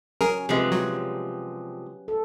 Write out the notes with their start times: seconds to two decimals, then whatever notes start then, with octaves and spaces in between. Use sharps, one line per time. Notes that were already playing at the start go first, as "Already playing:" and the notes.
0.21 F#3 C#4 G#4 A#4
0.49 C3 F3 G#3 G4 B4
0.72 F#3
2.08 A4